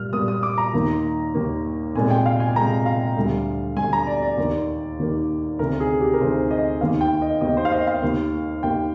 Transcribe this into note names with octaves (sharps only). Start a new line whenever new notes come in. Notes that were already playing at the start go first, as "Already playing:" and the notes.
Already playing: A#2 G3 A#3 F6
A#2 G3 A#3 D#6
D#6
D6
A#5
D#2 D#3 A#3
D#2 D#3 A#3
C2 A#2 G#3 G#5
G5
F5
G#5
C2 A#2 G#3 A#5
F5
D2 D3 G3
D2 D3 G3 G#5
A#5
D5
D5
D#2 D#3 A#3
D#2 D#3 A#3
D2 C3 D#3 A#4
G#4
G4
A#4
D2 C3 D#3 C5
D#5
D#2 D#3 A#3 F5
G5
D#5
D#2 D#3 A#3 D#5
C5
F5
D#5
F5
D#2 D#3 A#3
D#2 D#3 A#3 G5